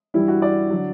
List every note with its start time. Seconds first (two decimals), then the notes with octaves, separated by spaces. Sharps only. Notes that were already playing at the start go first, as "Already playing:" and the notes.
0.14 G2 E3 G3 E4
0.28 F#4
0.42 D5
0.71 D3 F#3